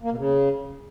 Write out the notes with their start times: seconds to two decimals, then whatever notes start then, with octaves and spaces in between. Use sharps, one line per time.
0.03 A#3
0.10 B2
0.18 C#3